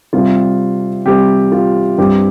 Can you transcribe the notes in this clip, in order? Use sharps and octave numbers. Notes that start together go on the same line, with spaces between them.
C3 G3 C4 F4
C3 G3 C4 G4
F4
G2 G3 C4 G4